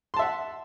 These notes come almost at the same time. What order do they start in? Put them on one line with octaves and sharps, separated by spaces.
C6 A5 E5 F#5